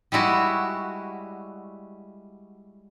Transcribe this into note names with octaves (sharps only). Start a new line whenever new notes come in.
G3 G#3 E4 F#4